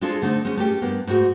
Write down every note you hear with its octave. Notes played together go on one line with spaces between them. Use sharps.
G#3 C4 D4 F4 G#4 A4
D3 A3 C4 D#4
G#3 C#4
A3 A#3 C#4 G4
G2 A#3 B3
G#2 G#3 A3 F#4